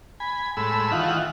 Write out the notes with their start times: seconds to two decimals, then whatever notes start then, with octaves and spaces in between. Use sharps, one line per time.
0.20 G#5 B5
0.57 A2 G#3 B5 E6
0.91 D#3 E3 F4 F#5